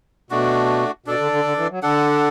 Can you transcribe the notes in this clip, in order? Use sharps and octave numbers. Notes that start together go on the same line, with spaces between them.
B2 A3 D4 F#4
B2 D4 A4 D5
D3
D3
D3
E3
F#3
D3 D4 A4 F#5